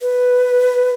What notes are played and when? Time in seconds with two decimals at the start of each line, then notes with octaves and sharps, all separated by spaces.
0.01 B4